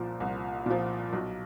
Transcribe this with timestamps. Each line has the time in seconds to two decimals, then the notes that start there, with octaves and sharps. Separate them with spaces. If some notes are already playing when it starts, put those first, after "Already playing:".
Already playing: C2 A#2 F3 A#4 C5
0.20 C2
0.66 A#2 F3
1.13 B1